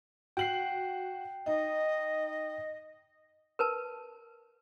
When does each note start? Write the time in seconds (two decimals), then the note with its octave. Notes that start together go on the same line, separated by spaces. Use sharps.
0.37 F#4 G5 C7 F#7
1.46 D#4 D#5
3.59 A#4 B4 A5